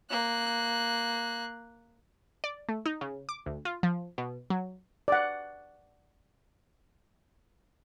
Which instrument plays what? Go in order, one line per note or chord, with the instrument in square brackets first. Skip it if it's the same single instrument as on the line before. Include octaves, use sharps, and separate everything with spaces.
[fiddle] A#3 F#6
[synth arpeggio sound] D5
A3
D#4
C#3
D6
D2
F4
F3
B2
F#3
[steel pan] D5 F#5